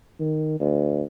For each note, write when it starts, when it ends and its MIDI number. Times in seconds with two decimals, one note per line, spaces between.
0.20 0.58 51
0.60 1.02 38